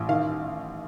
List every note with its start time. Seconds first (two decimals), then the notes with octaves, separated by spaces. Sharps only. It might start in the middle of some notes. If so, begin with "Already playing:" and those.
Already playing: A1
0.09 D#3 F5